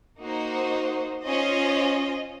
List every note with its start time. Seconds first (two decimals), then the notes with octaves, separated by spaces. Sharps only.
0.22 A#3 D#4 F#4 C5
1.25 C#4 F4 C5 D#5